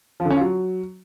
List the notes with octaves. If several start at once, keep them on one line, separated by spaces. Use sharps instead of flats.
F3
D3
C#4
F4
F#3